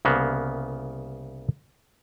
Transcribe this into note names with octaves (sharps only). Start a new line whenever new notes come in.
C2 C#3 A#3 B3